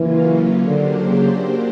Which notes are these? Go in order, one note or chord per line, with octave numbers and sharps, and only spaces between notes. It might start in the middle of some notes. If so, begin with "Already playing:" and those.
Already playing: C#3 E3 F#3 A#3 C#4 F4
D3 F#3 A#3 D4 G4 C5
C#3